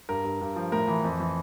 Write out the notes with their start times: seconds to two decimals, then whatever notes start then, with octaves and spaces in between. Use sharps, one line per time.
0.09 G2 A#4
0.24 G2
0.41 G2
0.56 F3
0.72 A2 A#4
0.88 E3
1.04 F2
1.20 E3